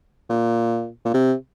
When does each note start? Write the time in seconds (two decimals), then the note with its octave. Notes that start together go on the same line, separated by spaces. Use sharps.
0.30 A#2
1.05 A#2
1.14 C3